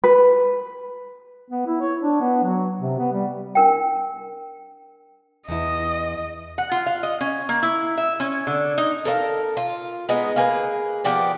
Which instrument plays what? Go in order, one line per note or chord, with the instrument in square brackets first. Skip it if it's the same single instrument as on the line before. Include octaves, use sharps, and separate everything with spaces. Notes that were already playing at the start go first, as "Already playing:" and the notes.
[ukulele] B4
[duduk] B3
E4
C#5
D4
B3
F#3
C3
B3
G3
[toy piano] D4 A#4 G5
[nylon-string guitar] E2 E4 [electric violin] D#5
[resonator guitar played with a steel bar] F#5
F4
F5
D#5
C#4
A#3
E4
E5
C#4
D3
D#4
[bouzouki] A4 A#4 D#5 F5
F4
G#3 B3 D#4
A#3 G#4 B4
F3 B3 G4 D5